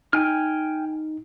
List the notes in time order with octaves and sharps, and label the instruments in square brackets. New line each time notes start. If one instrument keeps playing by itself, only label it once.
[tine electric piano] D#4 [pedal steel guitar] G5 G#5 F6